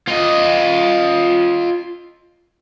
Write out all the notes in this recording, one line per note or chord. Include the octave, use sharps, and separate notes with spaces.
F4 D#5